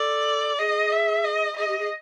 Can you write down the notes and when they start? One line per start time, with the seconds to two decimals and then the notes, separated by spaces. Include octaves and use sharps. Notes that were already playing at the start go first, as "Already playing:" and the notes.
Already playing: A4 D5
0.59 G#4 D#5
0.92 E5
1.24 D#5
1.57 G#4 D#5
1.68 G4
1.79 G#4